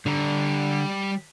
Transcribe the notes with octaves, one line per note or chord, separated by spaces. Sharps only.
D3 G3 A#5